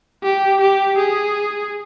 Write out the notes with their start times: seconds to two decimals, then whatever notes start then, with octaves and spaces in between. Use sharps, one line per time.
0.23 G4
0.61 G4
0.98 G#4